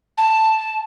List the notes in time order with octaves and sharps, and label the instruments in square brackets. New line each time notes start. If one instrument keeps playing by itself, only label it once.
[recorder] A5